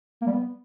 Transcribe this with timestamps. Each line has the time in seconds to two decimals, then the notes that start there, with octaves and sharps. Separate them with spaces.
0.22 A#3
0.27 G3
0.32 B3